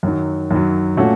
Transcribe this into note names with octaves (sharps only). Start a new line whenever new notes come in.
F#2 D#3 F#3
F#2 D#3 F#3
A#2 A3 C#4 F#4